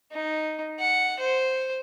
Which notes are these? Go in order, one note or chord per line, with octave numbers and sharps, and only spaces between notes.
D#4
F#5
C5